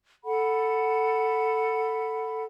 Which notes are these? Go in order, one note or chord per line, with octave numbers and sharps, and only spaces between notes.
A4 F#5 B5